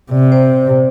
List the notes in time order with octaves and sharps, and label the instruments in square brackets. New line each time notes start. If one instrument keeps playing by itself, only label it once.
[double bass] C3 [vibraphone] D5
[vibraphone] C5